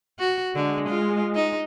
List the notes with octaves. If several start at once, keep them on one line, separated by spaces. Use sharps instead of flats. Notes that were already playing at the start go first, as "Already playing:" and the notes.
F#4
D3 G#3
F4
D#4